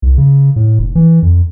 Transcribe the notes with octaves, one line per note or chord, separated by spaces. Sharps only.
C2
C#3
A2
F1
E3
F2